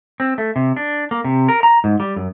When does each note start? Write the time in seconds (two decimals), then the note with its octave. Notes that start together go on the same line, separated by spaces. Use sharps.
0.20 C4
0.38 A3
0.56 C3
0.76 D4
1.11 A#3
1.24 C3
1.49 A#4
1.63 A#5
1.84 G#2
2.00 G3
2.16 F#2